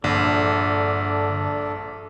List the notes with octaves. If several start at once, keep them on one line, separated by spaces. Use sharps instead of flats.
A#1 G2 D3 D4 A4 D5